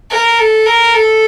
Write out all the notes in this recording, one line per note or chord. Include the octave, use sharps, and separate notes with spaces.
A#4
A4
A#4
A4